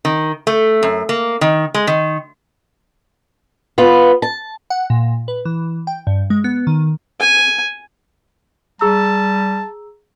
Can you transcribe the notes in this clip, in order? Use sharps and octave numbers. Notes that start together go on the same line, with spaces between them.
D#3
A3
F#2
A#3
D#3
G#3
D#3
B3 F4
A5
F#5
A#2
B4
E3
G5
G2
G#3
B3
D#3
G#5
G3 G#4 A5 A#5 E6